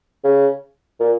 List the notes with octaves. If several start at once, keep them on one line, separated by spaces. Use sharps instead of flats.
C#3
A#2